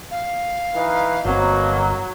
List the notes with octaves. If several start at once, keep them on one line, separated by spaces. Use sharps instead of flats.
F5
E3 D#4 B4
G1 B2 F#3 A#3 C4